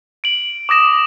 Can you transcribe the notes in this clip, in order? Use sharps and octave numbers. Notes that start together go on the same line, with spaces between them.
D7 F#7
D6 D#6 A#6 E7